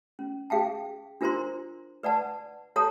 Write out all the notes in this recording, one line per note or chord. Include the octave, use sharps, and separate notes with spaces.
C#4
G#4 F5 G5 A5
D4 F4 A#4 C5 A#5 C6
B4 D5 F#5 A5
A4 C#5 A5 A#5 D#6